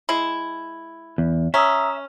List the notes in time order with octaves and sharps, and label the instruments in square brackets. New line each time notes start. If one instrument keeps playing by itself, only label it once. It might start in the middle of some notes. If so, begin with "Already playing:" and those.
[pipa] G#3 E4
[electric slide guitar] E2
[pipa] C#4 [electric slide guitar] E5 [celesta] A#5 D#6 E6